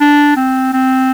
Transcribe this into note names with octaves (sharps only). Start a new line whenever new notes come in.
D4
C4
C4